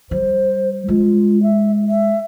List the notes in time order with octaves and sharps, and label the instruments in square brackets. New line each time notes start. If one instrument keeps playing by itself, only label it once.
[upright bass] G3 [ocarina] C5
[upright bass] G#3 [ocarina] F4
[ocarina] E5
E5